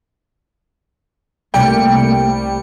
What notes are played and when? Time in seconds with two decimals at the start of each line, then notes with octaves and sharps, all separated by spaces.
1.54 C2 C3 G3 A3 A#3 G5 C#7